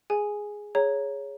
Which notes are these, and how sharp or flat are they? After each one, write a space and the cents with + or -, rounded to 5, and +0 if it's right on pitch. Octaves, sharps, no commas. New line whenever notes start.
G#4 +0 G#5 +0
G#4 +0 C#5 +5 A#5 +0